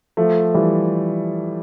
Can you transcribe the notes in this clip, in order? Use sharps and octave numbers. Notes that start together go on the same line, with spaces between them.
F3 A3
E3 G3